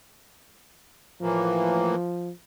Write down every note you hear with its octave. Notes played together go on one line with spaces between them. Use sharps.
A2 E3 F3 A#3